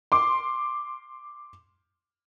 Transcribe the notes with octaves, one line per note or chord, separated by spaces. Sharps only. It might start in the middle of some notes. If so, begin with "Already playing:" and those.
C6 D6